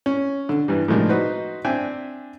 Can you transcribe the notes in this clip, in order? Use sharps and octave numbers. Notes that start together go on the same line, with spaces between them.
C#4
D3
G2 E3 G3
A2 C3 D#3 F3 G#3 D4
D#4 F#4 B4 C5
C4 D4 E5 G5 G#5